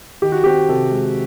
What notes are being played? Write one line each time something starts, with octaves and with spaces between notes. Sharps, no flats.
D#3 G4
F#4
C4 G4
C3 A4
G#3